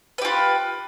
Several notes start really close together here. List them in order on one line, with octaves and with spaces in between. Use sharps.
B4 G4 F4